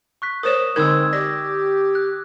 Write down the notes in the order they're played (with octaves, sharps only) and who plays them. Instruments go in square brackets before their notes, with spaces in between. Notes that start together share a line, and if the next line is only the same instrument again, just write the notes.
[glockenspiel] C#6 F#6 B6
[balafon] A#4 C5 C#5 [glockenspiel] D#6 E7
[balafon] D3 D#4 A#4 [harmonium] G#3 C4 [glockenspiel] E6 G#6
[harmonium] G4 [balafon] D5 [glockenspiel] A#6
[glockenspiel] F#6